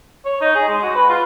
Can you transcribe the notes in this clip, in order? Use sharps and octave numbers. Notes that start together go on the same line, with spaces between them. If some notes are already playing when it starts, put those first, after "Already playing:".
C#5
D#4
G#4
G#3
F#4
B4
F4